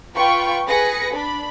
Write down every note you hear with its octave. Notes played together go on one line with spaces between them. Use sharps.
F4 B4 G5 C#6
G#4 B4 A#6 C#7
D4 B5